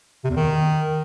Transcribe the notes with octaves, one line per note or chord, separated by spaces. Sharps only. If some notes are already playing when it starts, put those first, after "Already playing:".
C3
E2
D#3